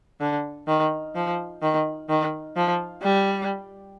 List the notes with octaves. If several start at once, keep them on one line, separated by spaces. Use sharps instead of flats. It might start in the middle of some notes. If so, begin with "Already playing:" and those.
D3
D#3
F3
D#3
D#3
F3
G3